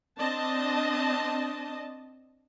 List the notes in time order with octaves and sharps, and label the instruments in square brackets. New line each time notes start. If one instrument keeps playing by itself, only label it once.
[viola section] C4 D4 D#5 A5